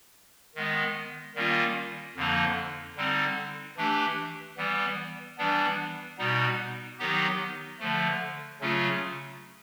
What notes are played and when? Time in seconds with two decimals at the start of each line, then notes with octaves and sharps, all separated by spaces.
0.55 D#3 G#3 B3
1.35 D#3 G3 A#3 C#4 F4
2.16 F2 D3 F3 A#3 D#4
2.96 D3 G3 C4 D#4
3.77 E3 A3 D4 G4
4.57 E3 G3 B3
5.38 E3 G3 B3 D4
6.18 B2 G3 B3 D#4
6.99 D#3 F#3 B3 D#4 G4
7.79 D3 F3 A3
8.61 C#3 F#3 A3 C#4 F4